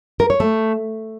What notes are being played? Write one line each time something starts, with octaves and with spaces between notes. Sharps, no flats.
A#4
C#5
A3